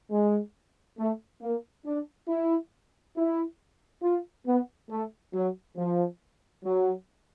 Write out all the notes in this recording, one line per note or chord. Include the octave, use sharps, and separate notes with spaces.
G#3
A3
A#3
D4
E4
E4
F4
B3
A3
F#3
F3
F#3